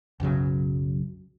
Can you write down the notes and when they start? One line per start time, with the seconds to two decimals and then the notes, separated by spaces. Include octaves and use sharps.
0.20 B1 F#2 C#3 F#3